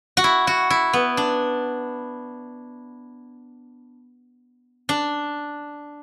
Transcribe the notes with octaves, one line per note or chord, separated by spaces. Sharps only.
F#4
E4
F#4
E4
B3
D4
D4